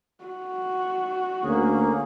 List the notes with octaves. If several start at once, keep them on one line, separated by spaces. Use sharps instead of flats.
F#4
D2 A#3 C#4 G#4